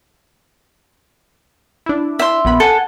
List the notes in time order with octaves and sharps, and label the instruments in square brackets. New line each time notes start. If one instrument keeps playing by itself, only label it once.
[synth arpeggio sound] D4 E4
[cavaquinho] E5 C6
[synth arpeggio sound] A#1 B3 B5
[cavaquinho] A4 [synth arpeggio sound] F#5 G#5